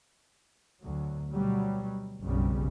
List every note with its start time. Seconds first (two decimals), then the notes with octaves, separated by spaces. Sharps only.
0.82 D2 F#3
1.32 B2 F#3 G3
2.22 F#1 B1 F2 C#3 G3